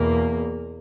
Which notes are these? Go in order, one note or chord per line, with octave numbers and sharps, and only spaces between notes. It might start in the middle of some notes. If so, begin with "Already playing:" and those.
Already playing: E2 B2 A#3